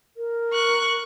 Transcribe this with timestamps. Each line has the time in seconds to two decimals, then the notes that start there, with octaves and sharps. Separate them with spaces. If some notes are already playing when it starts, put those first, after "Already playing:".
0.17 A#4
0.53 C#6 F#6